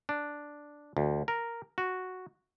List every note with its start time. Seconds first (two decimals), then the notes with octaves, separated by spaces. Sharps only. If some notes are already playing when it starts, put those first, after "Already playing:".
0.09 D4
0.97 D2
1.28 A#4
1.78 F#4